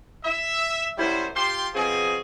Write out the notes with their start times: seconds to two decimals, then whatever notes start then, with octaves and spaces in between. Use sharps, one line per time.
0.23 E5
0.98 F#2 G3 E4 C5
1.35 F4 G4 G5 C6
1.74 B2 F3 C4 G#4